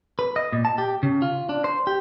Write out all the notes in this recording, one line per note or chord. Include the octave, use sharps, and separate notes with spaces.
B4
D#5
A#2
A5
G4
C#3
F4
D4
C5
G4